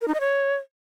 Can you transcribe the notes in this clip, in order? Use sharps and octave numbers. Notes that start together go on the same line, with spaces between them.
A#4
D#4
D#5
C#5